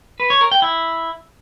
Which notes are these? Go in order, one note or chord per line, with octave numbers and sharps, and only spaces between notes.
B4
C#5
A#4
G5
E4